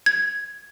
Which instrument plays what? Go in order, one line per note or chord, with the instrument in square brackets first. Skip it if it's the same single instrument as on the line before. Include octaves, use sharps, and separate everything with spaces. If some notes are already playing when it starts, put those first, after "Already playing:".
[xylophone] G#6